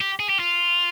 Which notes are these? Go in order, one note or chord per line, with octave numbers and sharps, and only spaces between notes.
G4
G#4
G4
F4